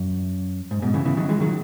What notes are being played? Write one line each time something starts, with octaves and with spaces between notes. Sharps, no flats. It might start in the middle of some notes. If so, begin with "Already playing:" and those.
Already playing: F#2
G#2
G#2 B2
C#3 E3
C#3 E3
D#3 F#3
E3 G#3
D#3 F#3